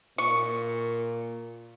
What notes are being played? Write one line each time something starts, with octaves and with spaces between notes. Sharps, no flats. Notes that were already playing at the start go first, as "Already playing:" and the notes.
A#2 C#6